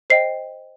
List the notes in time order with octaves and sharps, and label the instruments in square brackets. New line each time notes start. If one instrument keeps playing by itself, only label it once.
[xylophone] C5 D#5 G5 C7